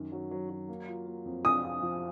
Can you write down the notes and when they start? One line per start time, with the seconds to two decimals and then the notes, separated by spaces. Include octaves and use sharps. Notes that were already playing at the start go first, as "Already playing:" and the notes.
Already playing: F#2 D#3
0.12 F#3
0.31 F#3
0.49 F#3
0.68 A#3
0.88 F4
1.07 A#3
1.25 F2
1.44 F3 D#6
1.63 F4
1.83 F3